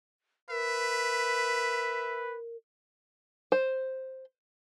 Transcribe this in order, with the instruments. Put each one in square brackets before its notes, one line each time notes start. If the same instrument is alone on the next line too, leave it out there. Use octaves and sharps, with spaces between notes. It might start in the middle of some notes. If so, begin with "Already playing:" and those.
[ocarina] A#4 [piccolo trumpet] B4 [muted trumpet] E5
[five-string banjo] C5